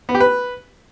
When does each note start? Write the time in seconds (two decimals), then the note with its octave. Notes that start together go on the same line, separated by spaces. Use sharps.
0.09 B3
0.15 G4
0.20 B4